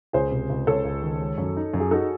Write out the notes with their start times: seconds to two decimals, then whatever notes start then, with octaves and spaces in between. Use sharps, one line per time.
0.13 C#2 G#4 C5
0.31 C3
0.49 C#2
0.67 C#2 A4 C#5
0.85 C#2
1.02 D#3
1.20 G#3
1.38 F#2
1.57 D#4
1.74 F#2
1.80 G#4
1.91 D#4 F#4 A4